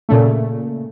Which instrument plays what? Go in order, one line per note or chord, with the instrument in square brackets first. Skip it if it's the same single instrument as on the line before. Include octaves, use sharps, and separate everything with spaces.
[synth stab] A#2 C#3 A3